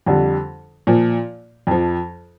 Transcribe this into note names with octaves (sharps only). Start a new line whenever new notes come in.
F2 D3 G3
A#2 F3
F2 F3